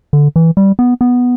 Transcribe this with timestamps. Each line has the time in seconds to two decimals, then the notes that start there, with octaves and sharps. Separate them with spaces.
0.13 D3
0.36 E3
0.57 G3
0.79 B3
1.01 B3